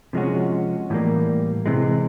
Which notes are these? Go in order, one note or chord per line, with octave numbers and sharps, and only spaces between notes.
C3 F3 G#3 C#4 F#4
A2 E3 G3 A#3
C3 E3 G#3